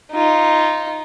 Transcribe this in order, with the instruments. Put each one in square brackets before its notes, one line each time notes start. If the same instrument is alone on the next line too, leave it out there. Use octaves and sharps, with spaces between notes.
[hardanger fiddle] D#4 F4